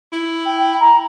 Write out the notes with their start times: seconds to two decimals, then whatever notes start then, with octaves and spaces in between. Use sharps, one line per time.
0.13 E4
0.45 G5
0.59 G5
0.80 A#5